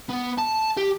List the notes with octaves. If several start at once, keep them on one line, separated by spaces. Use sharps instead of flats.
B3
A5
G4